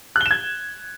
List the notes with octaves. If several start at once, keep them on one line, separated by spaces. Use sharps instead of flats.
F#6 G#6 E7 G7